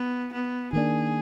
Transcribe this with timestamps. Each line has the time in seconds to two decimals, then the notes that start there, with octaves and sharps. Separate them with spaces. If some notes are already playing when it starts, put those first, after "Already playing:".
Already playing: B3
0.33 B3
0.73 D#3 A#3 D4 G#4